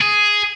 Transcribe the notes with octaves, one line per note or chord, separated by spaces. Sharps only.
G#4